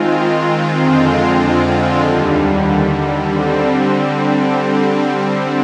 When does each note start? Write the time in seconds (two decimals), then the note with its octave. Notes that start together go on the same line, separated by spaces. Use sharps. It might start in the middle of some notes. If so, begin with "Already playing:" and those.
Already playing: D#3 G#3 C4 F4
0.79 F2 D3 G#3 C4 F4
2.03 D#2 D3 G3
3.28 D3 G3 C4